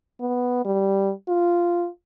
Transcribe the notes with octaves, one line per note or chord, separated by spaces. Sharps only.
B3
G3
F4